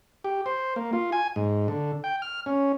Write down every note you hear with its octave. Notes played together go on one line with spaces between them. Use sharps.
G4
C5
A#3
F4
G#5
G#2
D3
G5
F6
C#4